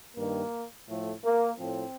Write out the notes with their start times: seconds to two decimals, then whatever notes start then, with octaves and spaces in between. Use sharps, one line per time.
0.17 G2 D#3 A#3
0.89 A2 F3 A3
1.24 A#3
1.59 A2 F3 C4